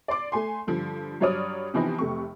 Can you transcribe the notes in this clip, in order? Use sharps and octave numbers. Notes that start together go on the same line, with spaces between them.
D5 C6 D6
A3 G#5 C6
G2 D3 F3
G2 F#3 C#5 D5 D#6 F6
C3 E3 F3 B3 C4 D#4
F1 C3 A3 C#6